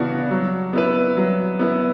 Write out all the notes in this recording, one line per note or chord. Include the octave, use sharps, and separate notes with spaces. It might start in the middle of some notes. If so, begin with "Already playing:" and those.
Already playing: C#3 E3 B3 D4 F#4
F#3
B3 E4 B4
F#3
B3 E4 B4